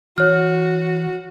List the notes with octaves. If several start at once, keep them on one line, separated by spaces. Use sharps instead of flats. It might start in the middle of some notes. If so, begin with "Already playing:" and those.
E3 F#4 C#5 F6